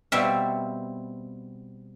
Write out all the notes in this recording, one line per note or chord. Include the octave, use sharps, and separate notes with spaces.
B2 G3 C4 E5 F5